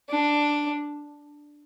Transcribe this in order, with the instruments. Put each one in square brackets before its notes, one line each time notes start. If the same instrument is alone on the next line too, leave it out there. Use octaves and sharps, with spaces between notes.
[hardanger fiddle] D4